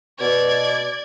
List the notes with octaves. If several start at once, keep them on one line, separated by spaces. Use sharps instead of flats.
B2 D5 G#6